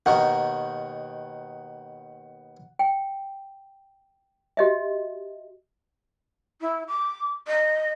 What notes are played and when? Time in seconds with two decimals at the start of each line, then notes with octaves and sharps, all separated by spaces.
0.06 D#2 B2 D#3 F#5
2.79 G5
4.57 F#4 G4 D#5 E5
6.61 E4
6.88 D6
7.47 D#5